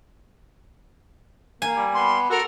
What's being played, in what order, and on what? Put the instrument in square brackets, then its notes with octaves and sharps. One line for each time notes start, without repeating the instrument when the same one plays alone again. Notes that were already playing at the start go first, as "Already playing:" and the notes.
[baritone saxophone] A#3 [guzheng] G#5
[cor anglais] G3
[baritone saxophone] B3 [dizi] C6
[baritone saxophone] F#4 [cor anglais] A4 [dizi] A#4